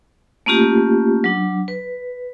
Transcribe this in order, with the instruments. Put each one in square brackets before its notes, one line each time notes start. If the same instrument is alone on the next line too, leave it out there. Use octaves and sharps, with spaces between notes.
[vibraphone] A3 A#3 C#4 F4 G4
F#3 D4
B4